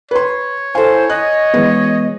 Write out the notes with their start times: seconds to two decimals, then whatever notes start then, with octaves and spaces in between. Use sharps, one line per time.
0.11 B4 C#5 C6
0.75 E4 A4 C5 F5 G#5
1.10 D#5 F#6
1.54 E3 G#3 B3 G#4